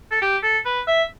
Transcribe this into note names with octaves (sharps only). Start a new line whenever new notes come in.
A4
G4
A4
B4
E5